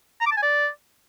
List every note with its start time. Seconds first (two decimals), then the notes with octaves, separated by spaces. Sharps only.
0.21 A#5
0.26 D6
0.31 A5
0.37 G#5
0.42 D5